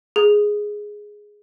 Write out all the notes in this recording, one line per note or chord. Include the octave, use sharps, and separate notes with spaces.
G#4